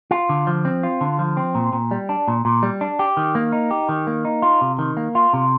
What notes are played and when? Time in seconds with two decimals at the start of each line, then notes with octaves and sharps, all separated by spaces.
0.11 F4
0.29 D3
0.47 F3
0.65 C4
0.83 F4
1.01 D3
1.19 F3
1.37 C4
1.55 A#2
1.73 A#2
1.91 G3
2.09 D4
2.28 A#2
2.45 A#2
2.63 G3
2.81 D4
2.99 G4
3.17 D#3
3.35 A#3
3.52 D#4
3.71 G4
3.89 D#3
4.07 A#3
4.25 D#4
4.42 F4
4.61 C3
4.79 D#3
4.97 A#3
5.15 F4
5.33 C3